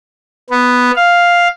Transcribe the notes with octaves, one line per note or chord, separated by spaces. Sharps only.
B3
F5